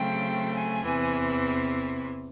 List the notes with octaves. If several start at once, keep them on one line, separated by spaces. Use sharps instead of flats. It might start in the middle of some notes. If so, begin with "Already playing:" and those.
Already playing: C#3 F#3 A3 C4 G5
G#5
E2 C3 E3